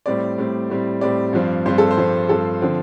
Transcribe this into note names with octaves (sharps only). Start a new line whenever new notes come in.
A2 G3 C4 D5
A2 G3 C4
A2 G3 C4
A2 G3 C4 D5
G2 F3 C4
G2 F3 C4 C5
A4
C5
G2 F3 C4
G2 F3 C4 A4
D3 F3 C4